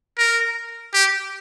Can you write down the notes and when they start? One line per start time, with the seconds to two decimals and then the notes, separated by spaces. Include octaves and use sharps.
0.18 A#4
0.93 G4